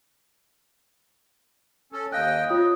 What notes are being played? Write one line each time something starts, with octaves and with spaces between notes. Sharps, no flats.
C#4 A4
D#2 D#5 F5 G5 F#6
C3 F4 C#5 D#6